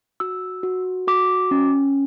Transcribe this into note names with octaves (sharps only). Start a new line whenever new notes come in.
F#4 E6
F#4
F#4 D6
C#4